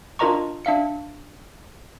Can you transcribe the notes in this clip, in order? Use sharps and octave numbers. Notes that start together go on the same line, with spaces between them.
D4 F4 A#4 D#5 A#5 C#6
D4 E5 F5 C#7